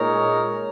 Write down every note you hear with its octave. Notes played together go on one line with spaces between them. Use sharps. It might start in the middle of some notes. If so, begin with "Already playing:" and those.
Already playing: A#2 G#3 D#4 A#4 C#5